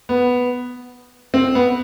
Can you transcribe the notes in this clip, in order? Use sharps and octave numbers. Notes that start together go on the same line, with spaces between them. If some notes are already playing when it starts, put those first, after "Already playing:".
B3
C4
B3